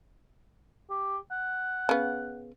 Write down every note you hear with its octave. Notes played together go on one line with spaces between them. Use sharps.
G4
F#5
C#3 B3